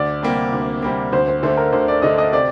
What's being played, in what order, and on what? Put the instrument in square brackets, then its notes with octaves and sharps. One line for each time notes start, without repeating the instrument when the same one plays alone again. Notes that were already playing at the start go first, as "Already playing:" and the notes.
Already playing: [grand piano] D2 [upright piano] D5
[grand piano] C3 G3 A#3
D2
C3 G3 A#3
[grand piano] D2 [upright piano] C5
[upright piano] C5
[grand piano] D3 A3 [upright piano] C5
[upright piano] A#4
[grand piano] D2 [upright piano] C5
[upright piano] D5
[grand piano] D3 A3 [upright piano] D#5
[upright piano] D#5
[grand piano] C3 [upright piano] D5